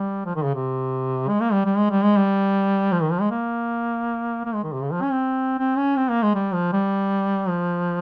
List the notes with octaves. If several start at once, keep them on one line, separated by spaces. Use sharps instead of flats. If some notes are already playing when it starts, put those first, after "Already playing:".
Already playing: G3
F3
D#3
C#3
C3
G#3
A#3
G3
G3
G#3
G3
G#3
G3
F3
D#3
F3
G#3
A#3
A#3
G#3
D#3
C3
C#3
F3
C#4
C4
C4
C#4
C4
A#3
G#3
G3
F3
G3
F3